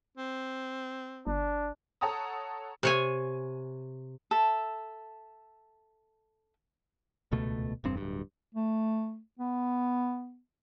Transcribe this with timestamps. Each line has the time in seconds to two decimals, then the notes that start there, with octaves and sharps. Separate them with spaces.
0.17 C4
1.27 G1 D4
2.01 A4 C#5 F#5 A5 A#5 D#6
2.83 C3 C#5 G#5
4.31 A4 E5
7.32 D#1 C#2 B2 A3
7.84 E1 G2 C4
7.97 D1 G2
8.55 A3
9.39 B3